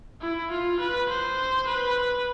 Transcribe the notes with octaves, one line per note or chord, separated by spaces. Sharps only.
E4
F4
B4
C5
B4